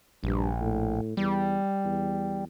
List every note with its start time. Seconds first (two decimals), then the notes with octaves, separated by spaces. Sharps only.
0.24 A#1 G2
0.61 A2
1.17 E2 G3
1.84 E2